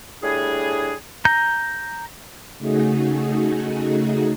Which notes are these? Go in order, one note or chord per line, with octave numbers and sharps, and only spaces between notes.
A2 G3 D4 G#4
A#5 G6
C#3 A3 D#4 F#4 G#4